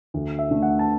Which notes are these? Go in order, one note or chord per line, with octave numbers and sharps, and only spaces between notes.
D2
E5
D3 A3
F#5
A5